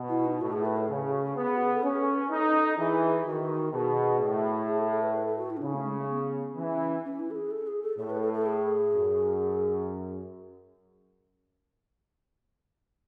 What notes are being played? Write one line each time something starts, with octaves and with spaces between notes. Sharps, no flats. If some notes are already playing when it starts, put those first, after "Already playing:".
Already playing: B2
E4
D#4
A2 F#4
G#4
B4
A4
C#3 G#4
G#4
F#4
G#4
B3
F#4
G#4
A4
C#4 B4
G#4
A4
B4
D#4 A4
E3 G#4
D#3 F#4
B2 G#4
A2
G#4
A4
A4
B4
B4
A4
F#4
E4
C#4
C#3 D#4
A3
G#3
A3
B3
E3 C#4
C#4
E4
A4
G#4
A4
G#4
A4
A2 A4
B4
A4
A4
G#4
F#2